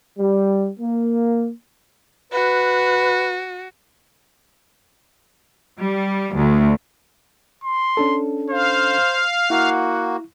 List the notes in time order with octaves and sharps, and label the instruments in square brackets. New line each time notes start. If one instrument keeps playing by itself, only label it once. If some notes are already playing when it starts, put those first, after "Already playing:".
[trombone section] G3
A#3
[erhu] F#4 [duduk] B4
[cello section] G3
D2
[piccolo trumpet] C6
[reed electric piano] C#4 D4 A4
[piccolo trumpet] C5 [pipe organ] F5
[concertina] A#3 F#4 [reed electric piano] E4 [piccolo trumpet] F#5